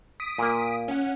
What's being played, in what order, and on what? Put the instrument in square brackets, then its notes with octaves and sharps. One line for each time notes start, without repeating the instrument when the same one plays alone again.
[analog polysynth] D#6 B6 D7
[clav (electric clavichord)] A#2 A#3
[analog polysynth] C#4 F#5